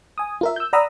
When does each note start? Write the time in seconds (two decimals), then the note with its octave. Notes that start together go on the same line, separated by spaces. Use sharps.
0.18 G#5 D#6
0.41 F4 A#4 E5
0.56 E6 G6
0.73 D5 F#5 A#5 B5 D#6 E6